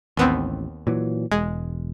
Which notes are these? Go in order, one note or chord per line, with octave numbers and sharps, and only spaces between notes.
A1 D#2 B3 C4
A#2 E3 F#3
E1 G#3